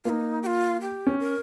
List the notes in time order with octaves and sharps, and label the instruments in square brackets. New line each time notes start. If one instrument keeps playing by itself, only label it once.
[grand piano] A#3 [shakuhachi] D#4 F4
[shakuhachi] G4
F4
G4
[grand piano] C#4
[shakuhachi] A#4